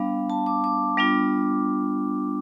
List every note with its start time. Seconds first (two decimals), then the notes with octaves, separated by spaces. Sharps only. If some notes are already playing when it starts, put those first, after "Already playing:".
Already playing: G3 B3 D4 F5
0.30 A5
0.46 D6
0.64 D6
0.97 G3 B3 D4 F4